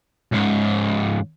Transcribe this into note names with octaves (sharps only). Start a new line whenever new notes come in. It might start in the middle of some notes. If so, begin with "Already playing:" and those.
C#2 G#2